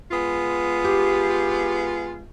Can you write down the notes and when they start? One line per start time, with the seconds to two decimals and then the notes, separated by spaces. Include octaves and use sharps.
0.11 G#3 B3 F4
0.85 G4